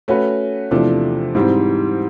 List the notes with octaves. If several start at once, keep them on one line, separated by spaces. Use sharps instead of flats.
A3 C#4 F#4 B4
E2 C3 F3 A3 D4
G#2 E3 G3 C4